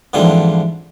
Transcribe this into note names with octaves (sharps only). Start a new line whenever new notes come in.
G#2 D3 E3 F3 G3 C4